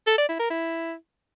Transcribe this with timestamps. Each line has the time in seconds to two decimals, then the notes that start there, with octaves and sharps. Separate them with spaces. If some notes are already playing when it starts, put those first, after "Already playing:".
0.07 A4
0.18 D5
0.29 E4
0.40 A#4
0.50 E4